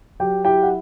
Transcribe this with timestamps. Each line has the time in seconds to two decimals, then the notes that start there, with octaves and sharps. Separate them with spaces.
0.20 F#3 G4 G5
0.45 E4 G4 G5
0.63 F#5